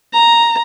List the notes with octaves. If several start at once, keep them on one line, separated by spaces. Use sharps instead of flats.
A#5